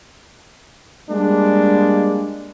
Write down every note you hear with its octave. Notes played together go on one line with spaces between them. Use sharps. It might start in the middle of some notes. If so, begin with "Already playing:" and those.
G3 G#3 A#3 D4